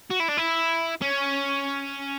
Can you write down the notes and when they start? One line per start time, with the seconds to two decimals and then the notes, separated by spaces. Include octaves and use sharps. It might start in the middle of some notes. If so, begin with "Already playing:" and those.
0.11 F#4
0.20 E4
0.29 D4
0.38 E4
1.02 C#4